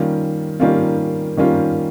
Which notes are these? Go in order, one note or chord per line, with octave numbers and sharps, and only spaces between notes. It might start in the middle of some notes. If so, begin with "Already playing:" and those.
Already playing: D#3 G3 A#3 C#4 F4
D#3 G3 A#3 C#4 F4
D#3 G3 A#3 C#4 F4